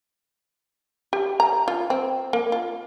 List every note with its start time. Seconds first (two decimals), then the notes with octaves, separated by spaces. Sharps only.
1.13 G4
1.40 A#5
1.68 F4
1.90 C4
2.33 A#3
2.52 F4